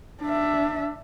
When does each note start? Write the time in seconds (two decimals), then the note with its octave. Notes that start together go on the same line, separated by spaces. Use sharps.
0.22 D4 E5